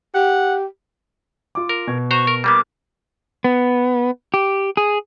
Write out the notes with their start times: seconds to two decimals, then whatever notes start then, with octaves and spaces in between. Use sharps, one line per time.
0.15 G4 F#5
1.55 F4 D6
1.69 A#4
1.87 B2 G#6
2.11 F#4 C5 A#5 C#6
2.27 A#4
2.44 G3 A#3 B3 D6
3.44 B3
4.34 G4
4.77 G#4